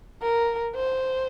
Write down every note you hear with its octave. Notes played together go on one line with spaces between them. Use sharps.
A#4
C5